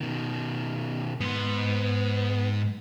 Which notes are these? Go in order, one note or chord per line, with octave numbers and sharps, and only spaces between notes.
B2 D#3
G#2 B3 C6